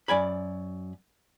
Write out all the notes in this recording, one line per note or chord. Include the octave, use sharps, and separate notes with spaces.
F#2 D5 G#5 B5